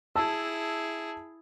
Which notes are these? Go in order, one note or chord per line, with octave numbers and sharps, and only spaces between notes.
E4 G#4 A5 E6